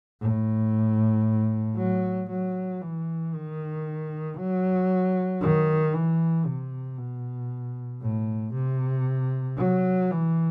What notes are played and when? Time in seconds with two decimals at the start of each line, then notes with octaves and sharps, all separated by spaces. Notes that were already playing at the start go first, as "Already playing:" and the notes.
0.21 A2
1.77 F#3
2.30 F#3
2.81 E3
3.34 D#3
4.38 F#3
5.42 D#3
5.93 E3
6.46 C3
6.98 B2
8.02 A2
8.54 C3
9.58 F#3
10.10 E3